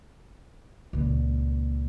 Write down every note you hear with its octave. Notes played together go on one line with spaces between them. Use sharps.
C#2 A#2